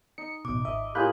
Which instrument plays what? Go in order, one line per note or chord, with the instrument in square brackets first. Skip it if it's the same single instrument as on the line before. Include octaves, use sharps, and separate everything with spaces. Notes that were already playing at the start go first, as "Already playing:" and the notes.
[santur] D#4 [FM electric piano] C#7
[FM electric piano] A1 B2 [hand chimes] D6
[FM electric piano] G#1 E5 [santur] D#5
[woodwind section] A2 G4 [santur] A#3 F4 G#4 [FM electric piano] B5 F#6 G6